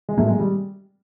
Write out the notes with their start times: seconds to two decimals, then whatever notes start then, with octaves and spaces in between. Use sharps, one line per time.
0.09 G#3
0.18 A2 F#3 A3 A#3
0.28 G#3
0.39 G3